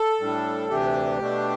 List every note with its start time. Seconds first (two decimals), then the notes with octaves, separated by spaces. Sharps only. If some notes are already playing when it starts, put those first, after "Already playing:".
Already playing: A4
0.20 A2 G3 D4
0.70 D2 C3 E3 A3 D4 G4
1.19 B2 A3 D4